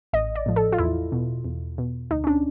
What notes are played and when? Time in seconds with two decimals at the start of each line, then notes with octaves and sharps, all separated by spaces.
0.13 A1 D#5
0.35 D5
0.46 A2 F3
0.56 A4
0.72 F4
0.78 E2 E4
1.12 B2
1.45 E2
1.78 B2
2.11 D2 D#4
2.24 C#4
2.27 D4